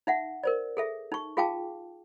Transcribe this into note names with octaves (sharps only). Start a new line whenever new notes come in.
D#4 E5 F#5
A#4 C5 D5
G#4 A4 E5
D#4 C#6
F4 G#4 F5 G5 A5 D6